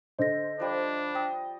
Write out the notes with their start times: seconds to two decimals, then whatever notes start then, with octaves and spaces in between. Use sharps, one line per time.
0.19 D3 C5 D#5 A#6
0.60 F3 G3 D4
1.15 D#5 G5